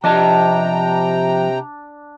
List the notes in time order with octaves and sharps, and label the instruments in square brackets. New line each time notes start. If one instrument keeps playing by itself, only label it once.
[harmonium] C3 G5 A#5 [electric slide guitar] F3 D#5 A5 [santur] D4